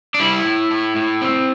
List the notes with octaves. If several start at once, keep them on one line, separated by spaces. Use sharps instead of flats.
D4
G3 E4
A2
A2
A2
C4